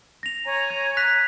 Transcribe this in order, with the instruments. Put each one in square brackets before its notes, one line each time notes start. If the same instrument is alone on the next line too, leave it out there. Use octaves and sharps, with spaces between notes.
[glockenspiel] A#6 F7
[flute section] C#5 G#5 A#5
[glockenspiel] G#6
F#6 B6 F7